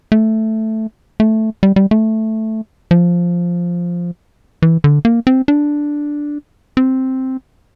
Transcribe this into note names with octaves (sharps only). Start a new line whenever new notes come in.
A3
A3
G3
G3
A3
F3
E3
D3
A#3
C4
D4
C4